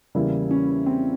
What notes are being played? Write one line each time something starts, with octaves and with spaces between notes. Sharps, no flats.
E2 C#3 G3 A#3 E4
C#4
C4